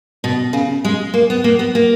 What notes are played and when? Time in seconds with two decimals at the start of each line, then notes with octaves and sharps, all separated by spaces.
0.24 B2
0.53 C#3
0.84 G#3
1.14 A#3
1.30 B3
1.44 A#3
1.59 B3
1.75 A#3